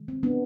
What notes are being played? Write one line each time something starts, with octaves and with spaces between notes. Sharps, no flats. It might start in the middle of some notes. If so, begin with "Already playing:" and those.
Already playing: C3 D#3 G#3
C4
B3 D4